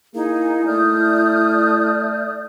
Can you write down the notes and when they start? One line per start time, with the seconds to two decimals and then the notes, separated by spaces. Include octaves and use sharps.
0.15 A#3 D#4 E4 G#4
0.66 A3 D5 D#6 F6 G6